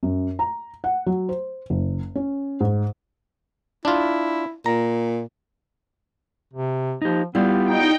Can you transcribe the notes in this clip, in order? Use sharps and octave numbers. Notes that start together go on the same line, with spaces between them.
F#2
A#5
F#5
F#3
C5
F#1
C#4
G#2
D4 E4 F4
A#2 A#5
C3
F3 D#4 G4
G3 B3 E4 F4 G4
D#4 G5